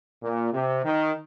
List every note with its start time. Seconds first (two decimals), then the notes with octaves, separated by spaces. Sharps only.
0.23 A#2
0.53 C3
0.85 D#3